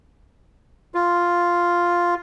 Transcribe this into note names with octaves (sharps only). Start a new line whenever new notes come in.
F4